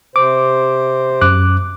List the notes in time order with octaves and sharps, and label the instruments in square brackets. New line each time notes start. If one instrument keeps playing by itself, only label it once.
[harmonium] C3 C5 [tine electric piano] D6
[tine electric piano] F#2 D6 F#6